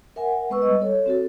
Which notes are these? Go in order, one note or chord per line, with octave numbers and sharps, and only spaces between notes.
A#4 E5 F#5 G#5
G#3 B3 B4 C#6 E6
G3 D#5
A4 C#5
C4 F#4 A4